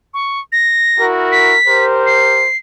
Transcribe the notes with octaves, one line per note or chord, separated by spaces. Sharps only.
C#6
A#6
E4 F#4 A#4
B6
G4 A#4 C5
C7